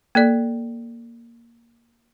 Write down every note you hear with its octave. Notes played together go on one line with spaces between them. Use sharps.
A#3 A4 D5